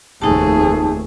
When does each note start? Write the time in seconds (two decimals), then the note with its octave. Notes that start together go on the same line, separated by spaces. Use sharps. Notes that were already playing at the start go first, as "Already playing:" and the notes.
0.22 F1 D#2 A3 D#4 G#4 A5